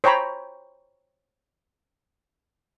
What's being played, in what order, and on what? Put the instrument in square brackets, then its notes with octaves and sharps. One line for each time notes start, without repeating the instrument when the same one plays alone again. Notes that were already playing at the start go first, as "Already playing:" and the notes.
[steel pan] C5 C#5 G5 A#5 B5